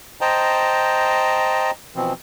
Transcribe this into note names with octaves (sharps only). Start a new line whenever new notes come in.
C5 D#5 G5 A5 A#5
B2 E3 F3 C4